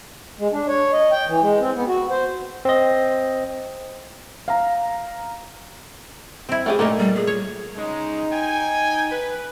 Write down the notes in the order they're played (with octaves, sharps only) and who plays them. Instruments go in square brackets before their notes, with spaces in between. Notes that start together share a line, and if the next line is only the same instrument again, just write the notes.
[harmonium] G#3
D4
C#5
D#5
G5
E3
G#3
C4
B3
F#4
C5
[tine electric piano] C4 D#5
[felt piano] F5 A#5
[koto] C4 E4
[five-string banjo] A3 G4 G#4
[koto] A#2 D#4 [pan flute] A3 [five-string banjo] A#3 A4
[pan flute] G3
G#4
[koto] C#5
[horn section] C#3 G#3 [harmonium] D#4
[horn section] G5 G#5
B4